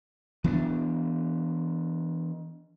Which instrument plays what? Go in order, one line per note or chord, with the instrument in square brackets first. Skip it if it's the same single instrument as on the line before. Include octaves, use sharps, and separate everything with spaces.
[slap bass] E3 B3 C4 D4